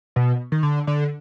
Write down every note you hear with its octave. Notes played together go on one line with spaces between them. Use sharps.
B2
D#3
D3
D3